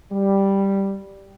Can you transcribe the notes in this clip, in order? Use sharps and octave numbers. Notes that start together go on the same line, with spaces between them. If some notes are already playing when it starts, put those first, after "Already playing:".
G3